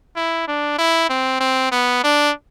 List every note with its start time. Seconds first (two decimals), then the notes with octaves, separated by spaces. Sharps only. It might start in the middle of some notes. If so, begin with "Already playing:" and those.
0.16 E4
0.48 D4
0.79 E4
1.10 C4
1.41 C4
1.72 B3
2.04 D4